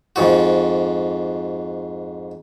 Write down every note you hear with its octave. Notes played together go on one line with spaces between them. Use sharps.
F2 G#2 F#4